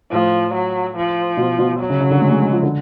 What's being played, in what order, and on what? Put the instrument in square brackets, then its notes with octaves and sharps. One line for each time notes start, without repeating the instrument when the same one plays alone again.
[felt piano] A2 [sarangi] F3
[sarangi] F#3
F3
[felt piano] B2
B2
[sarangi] F#3
[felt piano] C#3
C#3
D3
G#3
G#3
G#3
F3
D3